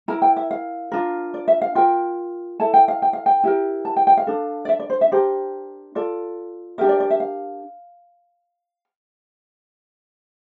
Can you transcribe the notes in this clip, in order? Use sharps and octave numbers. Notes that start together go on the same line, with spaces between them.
E4 A#4 A#5
G5
E5
F5
D4 F4 A#4
D5
E5
F5
F4 A#4 G5
E4 A4 A5
G5
F5
G5
F5
G5
E4 G4 A#4
A5
G5
G5
F5
D4 A4
D5
E5
D5
C5
E5
D4 G4 A#4 C5
F4 A4 D5
D4 G4 A#4 E5
D5
D5
E5
F5